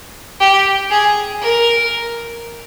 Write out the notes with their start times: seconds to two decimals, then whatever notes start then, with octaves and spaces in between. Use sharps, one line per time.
0.40 G4
0.91 G#4
1.42 A#4